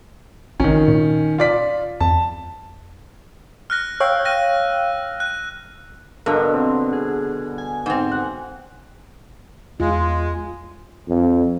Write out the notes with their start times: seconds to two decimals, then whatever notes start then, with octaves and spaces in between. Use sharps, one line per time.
0.60 A#1 D#3 C#4
0.88 A#2
1.38 F4 D5 B6
2.01 F2 A5
3.70 F6 F#6 A#6
4.00 C#5 F5 G5 E6
4.25 F#6 A#6 D#7
5.20 F#6
6.26 G2 B2 D3 A#4
6.54 C4
6.93 G#4
7.58 G#5
7.86 G#2 C4
8.11 F#5
9.80 E2 G#3 F4
11.08 F2